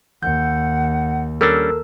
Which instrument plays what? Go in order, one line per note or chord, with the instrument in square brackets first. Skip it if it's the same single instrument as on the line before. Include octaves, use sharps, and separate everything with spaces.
[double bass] D#2 [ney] F#5 [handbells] G6
[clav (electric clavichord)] G3 C#4 D4 [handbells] A4 A#4 E6